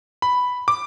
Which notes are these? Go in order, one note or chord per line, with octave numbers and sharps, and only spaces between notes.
B5
D6